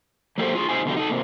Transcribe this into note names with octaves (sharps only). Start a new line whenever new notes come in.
F#3 A#3 G4 A4 A#4 C5
F4 G#4
C3 D#4 F4 C5 G#5
B2 D3 F#3 G4
D#4 A4
C3 A#3